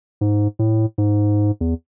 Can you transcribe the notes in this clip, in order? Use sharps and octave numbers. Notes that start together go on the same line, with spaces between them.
G#2
A2
G#2
E2